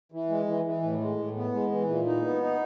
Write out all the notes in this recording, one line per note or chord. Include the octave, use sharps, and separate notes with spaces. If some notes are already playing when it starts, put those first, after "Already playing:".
E3
G#3
E3
E3
A2
G#3
A2
B3
G#3
E3
A#2
D#4
B3
D#4